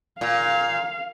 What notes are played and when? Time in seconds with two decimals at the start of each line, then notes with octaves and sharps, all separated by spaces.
0.21 A#2 F5